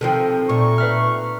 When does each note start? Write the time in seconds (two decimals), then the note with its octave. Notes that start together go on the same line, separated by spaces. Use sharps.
0.01 C3 D#3 F3 A4
0.49 A#2 A3 D#4 C#6
0.78 B4 E5 F6